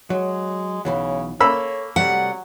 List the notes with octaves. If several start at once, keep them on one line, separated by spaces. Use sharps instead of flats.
F#3 G#3
B1 C#3 E3 F#3
A#3 A4 C#5 B5 E6
C3 F#3 G3 A3 F#5